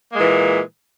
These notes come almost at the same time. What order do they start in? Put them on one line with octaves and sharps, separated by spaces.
A#3 G#3 A#2 E3